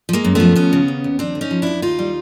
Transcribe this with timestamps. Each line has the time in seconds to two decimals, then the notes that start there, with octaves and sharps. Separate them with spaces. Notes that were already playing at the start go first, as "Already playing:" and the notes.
0.09 F3
0.13 G#3 A#3
0.25 F#2
0.35 F3 A3 B3
0.55 D#2 B3 C#4
0.73 C#3
0.88 D#2
1.04 D#2
1.19 F3 C4 D4
1.35 D3
1.41 C#4 D#4
1.51 F3
1.62 F2 D4 E4
1.82 D#2 D#4 F4
1.99 G3